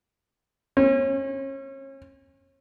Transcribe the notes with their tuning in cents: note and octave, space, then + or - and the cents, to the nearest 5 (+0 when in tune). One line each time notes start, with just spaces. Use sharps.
C#4 -35